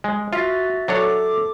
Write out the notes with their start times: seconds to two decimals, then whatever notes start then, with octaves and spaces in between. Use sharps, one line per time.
0.04 G#3
0.33 F4 F#4 E5 A6 B6
0.88 F#3 D4 A4 C#5 D6